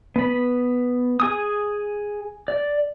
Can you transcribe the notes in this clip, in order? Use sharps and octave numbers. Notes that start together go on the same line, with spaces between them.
B3 B5
G#4 G#5 D#6
D5